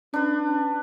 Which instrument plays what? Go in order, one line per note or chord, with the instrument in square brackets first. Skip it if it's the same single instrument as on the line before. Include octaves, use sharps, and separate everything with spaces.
[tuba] C#4 [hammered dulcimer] D4 B4